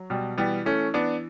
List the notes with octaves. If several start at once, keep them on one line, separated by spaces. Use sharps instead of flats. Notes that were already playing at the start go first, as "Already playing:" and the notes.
Already playing: F#3
B2 G3
E3 G3 B3
E3 A3 C#4
E3 B3 D4